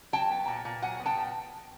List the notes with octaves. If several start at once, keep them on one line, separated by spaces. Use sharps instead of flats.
F#3 G5 A5
B3
A#2
A#2
F#3 F#5 G#5
B3
G5 A5
A#2